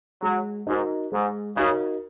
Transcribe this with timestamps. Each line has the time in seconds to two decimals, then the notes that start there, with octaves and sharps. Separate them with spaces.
0.22 F#3 G#3
0.67 G#2 D#4 F#4 A#4
1.12 G#2 G#3
1.56 C#3 D#4 F#4 A#4